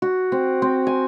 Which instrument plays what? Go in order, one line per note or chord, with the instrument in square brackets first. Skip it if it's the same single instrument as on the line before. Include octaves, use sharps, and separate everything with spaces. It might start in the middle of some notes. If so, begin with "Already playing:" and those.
[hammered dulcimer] F#4
C4
C4
G#5